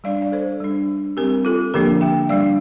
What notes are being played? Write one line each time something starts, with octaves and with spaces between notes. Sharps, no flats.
G3 D4 D5 F5
D5
A4 C5
G3 D4
G3 C4 G4 A#4
F4 A4
D3 F3 A#3 D4 G4 A#4
E5 G5
G3 D4 D5 F5